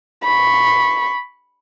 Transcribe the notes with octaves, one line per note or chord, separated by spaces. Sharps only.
B5 C#6